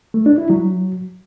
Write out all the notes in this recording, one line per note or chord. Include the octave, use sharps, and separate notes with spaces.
A3
D4
E4
F#3